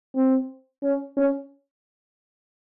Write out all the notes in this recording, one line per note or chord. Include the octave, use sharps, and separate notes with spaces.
C4
C#4
C#4